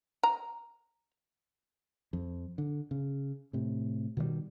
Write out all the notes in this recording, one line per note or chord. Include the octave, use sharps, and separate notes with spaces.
A#5
F2
D3
C#3
A2 C3
B2 D#3 E3 G3